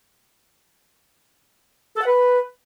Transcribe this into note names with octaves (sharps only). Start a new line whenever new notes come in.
A4
F#5
B4